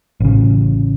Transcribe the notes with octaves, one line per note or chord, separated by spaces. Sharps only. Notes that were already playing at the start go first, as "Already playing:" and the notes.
A1 C#3